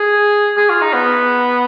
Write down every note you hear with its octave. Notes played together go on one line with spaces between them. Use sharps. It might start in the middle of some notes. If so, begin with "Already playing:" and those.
Already playing: G#4
G#4
F4
D#4
B3